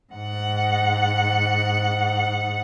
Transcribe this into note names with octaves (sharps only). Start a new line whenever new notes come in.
G#2 F#5